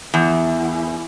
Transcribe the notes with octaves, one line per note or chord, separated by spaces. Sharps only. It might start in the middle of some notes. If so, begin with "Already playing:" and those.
E2